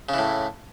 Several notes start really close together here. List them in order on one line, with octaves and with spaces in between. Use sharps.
C#3 E3 A2